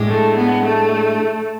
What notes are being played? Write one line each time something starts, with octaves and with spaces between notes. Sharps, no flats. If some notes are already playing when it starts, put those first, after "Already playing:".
Already playing: A2 G#3 D4
A3
B3
A3